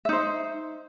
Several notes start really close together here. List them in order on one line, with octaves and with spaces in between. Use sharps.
E5 D#4 C5